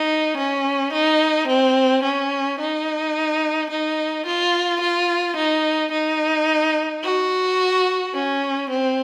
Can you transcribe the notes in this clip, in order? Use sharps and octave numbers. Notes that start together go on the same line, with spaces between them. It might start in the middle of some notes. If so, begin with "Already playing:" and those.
Already playing: D#4
C#4
D#4
C4
C#4
D#4
D#4
F4
F4
D#4
D#4
F#4
C#4
C4